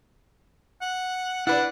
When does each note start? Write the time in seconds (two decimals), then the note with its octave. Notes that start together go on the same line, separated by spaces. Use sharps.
0.81 F#5
1.47 D4 E4 B4 D5 F#5